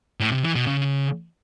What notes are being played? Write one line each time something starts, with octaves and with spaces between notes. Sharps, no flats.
A2
C3
E3
B2
C#3